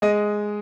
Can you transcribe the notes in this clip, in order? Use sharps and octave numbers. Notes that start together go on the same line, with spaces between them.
G#3 D#5